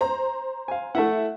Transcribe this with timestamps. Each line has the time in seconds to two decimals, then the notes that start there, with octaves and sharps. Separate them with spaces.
0.01 C5 A#5
0.68 F5 G#5
0.95 A3 E4 E5 F#5